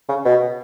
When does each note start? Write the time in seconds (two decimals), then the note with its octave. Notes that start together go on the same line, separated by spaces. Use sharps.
0.09 C#3
0.25 B2